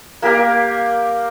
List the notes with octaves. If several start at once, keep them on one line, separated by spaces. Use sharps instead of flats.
A#3 G4 A#4 F5